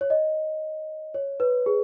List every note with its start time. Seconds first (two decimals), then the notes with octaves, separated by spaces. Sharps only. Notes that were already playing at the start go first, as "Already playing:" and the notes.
0.01 C#5
0.10 D#5
1.14 C#5
1.40 B4
1.66 G#4